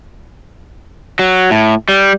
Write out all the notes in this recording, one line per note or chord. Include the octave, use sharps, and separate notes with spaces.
F#3
A2
G3